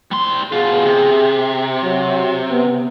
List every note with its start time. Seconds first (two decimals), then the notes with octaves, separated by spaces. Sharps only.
0.11 G3 C6
0.52 B2 F4 G#4
0.85 C3
1.83 F#3
2.50 B3